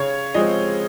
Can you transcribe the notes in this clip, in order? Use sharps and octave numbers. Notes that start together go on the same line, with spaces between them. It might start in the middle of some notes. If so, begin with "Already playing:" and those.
Already playing: C#3 C#5
F3 G#3 C4 D#5